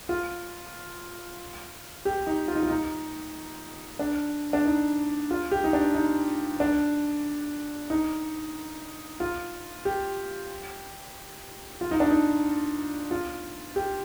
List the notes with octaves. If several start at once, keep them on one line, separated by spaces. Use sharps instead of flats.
F4
G4
D#4
F4
D#4
F4
D#4
D4
D4
D#4
F4
G4
D#4
D4
D#4
D4
D#4
F4
G4
F4
D#4
D4
D#4
F4
G4